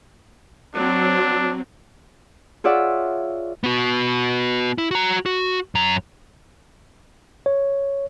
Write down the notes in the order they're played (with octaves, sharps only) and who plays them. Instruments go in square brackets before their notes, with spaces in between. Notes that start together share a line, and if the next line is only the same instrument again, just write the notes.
[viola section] F#3 C4 [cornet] D4
[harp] F4 G#4 C#5 D5 E5 F#5
[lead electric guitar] B3 F#4
E4
F#4 A#5
F#4
F#2 A#5
[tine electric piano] C#5